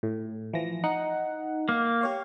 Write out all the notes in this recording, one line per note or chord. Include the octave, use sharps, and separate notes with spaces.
A2
E3 F3 A#6
D#4 F#5
A#3
G4 C#5 F5